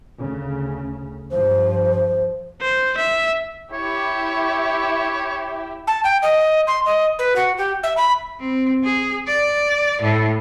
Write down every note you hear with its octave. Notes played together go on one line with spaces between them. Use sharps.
D2 C#3
G2 F3 C5
C5
E5
E4 G4 C#5 E5
A5
G5
D#5
C6
D#5
B4
F#4
G4
E5
B5
C4
G#4
D5
A2